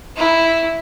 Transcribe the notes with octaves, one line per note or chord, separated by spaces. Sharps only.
E4